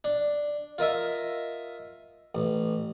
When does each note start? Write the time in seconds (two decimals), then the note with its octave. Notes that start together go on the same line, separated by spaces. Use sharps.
0.04 D4
0.78 F4 A#4 D#5 E5
2.35 A1